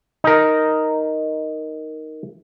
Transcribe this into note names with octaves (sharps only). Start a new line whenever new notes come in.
D#4 A#4